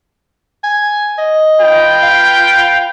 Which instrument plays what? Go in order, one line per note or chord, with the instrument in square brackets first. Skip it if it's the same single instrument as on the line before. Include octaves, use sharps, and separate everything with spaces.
[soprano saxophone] G#5
D#5
[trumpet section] F4 B4 G5
[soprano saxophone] F5